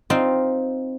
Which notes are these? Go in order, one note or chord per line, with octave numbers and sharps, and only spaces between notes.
C4 D#4 F4